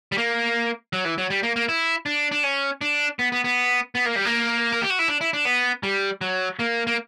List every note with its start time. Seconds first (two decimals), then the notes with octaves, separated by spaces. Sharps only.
0.12 G3
0.18 A#3
0.93 F#3
1.05 E3
1.18 F#3
1.30 G3
1.43 A#3
1.56 A#3
1.68 E4
2.06 D4
2.32 D4
2.43 C#4
2.81 D4
3.19 B3
3.32 B3
3.44 B3
3.95 B3
4.05 A#3
4.16 G3
4.25 A#3
4.72 A#4
4.82 G4
4.90 F#4
4.99 E4
5.08 D4
5.21 E4
5.33 D4
5.45 B3
5.83 G3
6.21 F#3
6.59 A#3
6.87 A#3